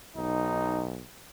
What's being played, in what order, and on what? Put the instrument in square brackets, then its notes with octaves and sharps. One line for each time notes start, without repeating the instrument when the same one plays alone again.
[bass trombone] B1 [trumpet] D#4